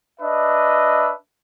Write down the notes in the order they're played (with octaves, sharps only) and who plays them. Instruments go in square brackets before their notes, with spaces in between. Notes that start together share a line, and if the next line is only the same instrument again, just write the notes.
[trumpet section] D4 B4 D#5 E5